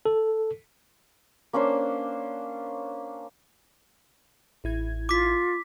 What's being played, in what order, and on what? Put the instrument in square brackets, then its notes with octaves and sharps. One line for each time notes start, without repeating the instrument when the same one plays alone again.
[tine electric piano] A4
[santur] A#3 C#4 D4 C5
[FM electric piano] A1 E4 G#6
[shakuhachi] F4 [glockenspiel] D6 B6